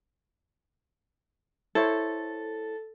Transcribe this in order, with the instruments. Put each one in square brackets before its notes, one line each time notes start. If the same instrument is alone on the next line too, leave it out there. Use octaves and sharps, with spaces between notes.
[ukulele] E4 C5 C#5 [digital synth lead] A4